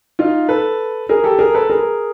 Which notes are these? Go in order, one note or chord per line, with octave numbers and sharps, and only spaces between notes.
D#4 F4
A4 B4
G#4 A#4
G4 A4
G#4 A#4
A4 B4
G#4 A#4